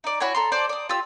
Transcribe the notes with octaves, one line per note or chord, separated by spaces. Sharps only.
D#4 D5
E4 F#4 C#5 G#5
A4 A#5 C6
C5 D5 A5
D5 D#6
F4 G4 E6